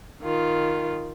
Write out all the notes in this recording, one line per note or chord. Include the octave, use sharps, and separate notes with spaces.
D#3 F4